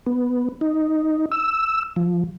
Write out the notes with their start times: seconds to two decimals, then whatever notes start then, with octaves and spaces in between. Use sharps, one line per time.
0.06 B3
0.61 D#4
1.32 E6
1.96 F3